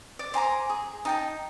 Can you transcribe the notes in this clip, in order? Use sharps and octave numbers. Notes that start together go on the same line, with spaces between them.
D5
C5 G#5 A#5 D6
G#4
D#4 G5 A5